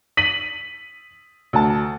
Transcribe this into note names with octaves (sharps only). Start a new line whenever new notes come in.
B6 D#7 F#7
D2 A5